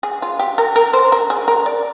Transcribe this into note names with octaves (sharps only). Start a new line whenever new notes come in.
G#4
F4
G4
A#4
A#4
C5
A#4
G#4
A#4
D5